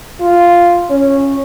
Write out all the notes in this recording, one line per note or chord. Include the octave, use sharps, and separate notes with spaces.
F4
C#4